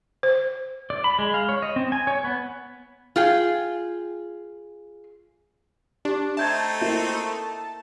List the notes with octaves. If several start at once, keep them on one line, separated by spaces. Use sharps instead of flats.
C5
D5
B5
G#3
F5
C#5
D#5
C4
G#5
C#5
B3
F4 G#4 G5
D4 G4
A3 C4 D#4 E5 A5 G6 G#6
A#3 E4